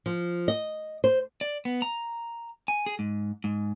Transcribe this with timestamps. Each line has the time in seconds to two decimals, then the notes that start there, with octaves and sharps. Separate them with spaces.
0.06 F3
0.48 D#5
1.04 C5
1.41 D5
1.65 B3
1.82 A#5
2.68 G#5
2.86 G#4
2.99 G#2
3.44 G#2